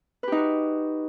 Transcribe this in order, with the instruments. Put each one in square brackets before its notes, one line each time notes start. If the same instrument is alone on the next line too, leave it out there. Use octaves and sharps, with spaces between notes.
[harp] B4
G4
D#4
F#4